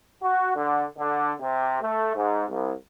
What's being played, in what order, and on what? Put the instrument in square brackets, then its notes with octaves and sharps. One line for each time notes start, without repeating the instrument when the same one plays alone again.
[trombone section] F#4
D3
D3
C3
A3
G#2
C2